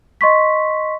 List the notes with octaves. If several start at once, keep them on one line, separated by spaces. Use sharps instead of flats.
D#5 C6 C#6 B6